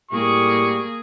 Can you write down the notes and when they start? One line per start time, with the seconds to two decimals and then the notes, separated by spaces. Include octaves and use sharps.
0.11 A2 G3 A#3 G4 G#4 C#6